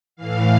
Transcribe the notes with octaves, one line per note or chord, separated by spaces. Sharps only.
A2 E3 F5